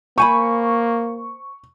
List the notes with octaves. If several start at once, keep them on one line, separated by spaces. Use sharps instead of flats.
A#3 C5 G#5 B5 C#6